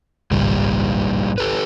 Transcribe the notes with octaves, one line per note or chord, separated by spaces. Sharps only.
G#1 C#2 G2 A#2 G3
G4 A4 B4